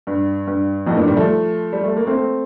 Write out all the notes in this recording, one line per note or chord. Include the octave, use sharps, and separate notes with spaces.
G2
G2
F2 A2
G2 A#2
D#3 G3
F3 A3
G3
A3
A#3
A3 C4